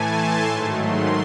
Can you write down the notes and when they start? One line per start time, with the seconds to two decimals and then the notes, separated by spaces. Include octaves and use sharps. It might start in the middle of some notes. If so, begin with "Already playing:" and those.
Already playing: A2 E3 A3 G#5 A5
0.16 C6
0.48 G#2 D#3 F#3 A3
0.80 C6